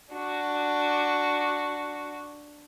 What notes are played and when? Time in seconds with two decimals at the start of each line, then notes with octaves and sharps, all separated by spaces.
0.12 D4 F#4